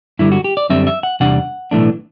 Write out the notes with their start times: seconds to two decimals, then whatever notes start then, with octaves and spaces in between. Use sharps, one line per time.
0.19 G2 D3 G3 E4
0.32 F#4
0.44 G4
0.57 D5
0.70 F#2 D3 G3 C4 E5
0.87 E5
1.03 F#5
1.20 E2 C3 G3 D4 F#5
1.71 B1 A2 E3 A3 D4